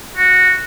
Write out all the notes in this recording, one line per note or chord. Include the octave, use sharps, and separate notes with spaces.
F#4